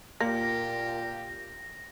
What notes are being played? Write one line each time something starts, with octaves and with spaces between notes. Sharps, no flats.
A#2 A#3 F4 G4 A#6